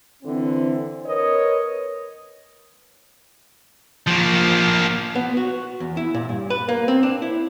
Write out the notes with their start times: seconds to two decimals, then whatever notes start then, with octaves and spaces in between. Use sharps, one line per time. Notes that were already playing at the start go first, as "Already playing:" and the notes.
0.23 D3 E3 C4
1.06 A#4 B4 C#5 D#5
4.07 F3 A#3
5.15 B3
5.37 F#4
5.80 E2
5.97 E4
6.14 A#2
6.29 G2
6.50 B4
6.69 A#3
6.88 C4
7.03 D4
7.22 E4